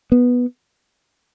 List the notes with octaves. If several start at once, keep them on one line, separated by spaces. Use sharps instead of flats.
B3